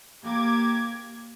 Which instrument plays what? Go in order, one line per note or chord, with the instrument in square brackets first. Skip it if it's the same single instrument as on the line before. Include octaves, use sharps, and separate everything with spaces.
[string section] A#3 G4 D6 G#6